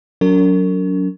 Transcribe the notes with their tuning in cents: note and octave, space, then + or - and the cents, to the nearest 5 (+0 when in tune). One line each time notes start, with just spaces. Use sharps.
F#3 +0 C#4 +45 A#4 -35